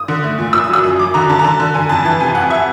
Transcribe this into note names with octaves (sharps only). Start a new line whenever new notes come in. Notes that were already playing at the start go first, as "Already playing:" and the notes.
Already playing: D#6
D3
A3
A#2
A#2 E6
D#6
F#3 E6
F#2 D#6
F#3 D6
D3 A#5
D3 A5
A#5
D3 A5
D3
D3 G#5
F2 A5
E3 A5
C3 G#5
F2 F#5
E5